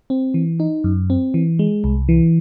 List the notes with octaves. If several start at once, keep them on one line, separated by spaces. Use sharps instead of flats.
C4
E3
D#4
F#2
C4
E3
G#3
C2
E3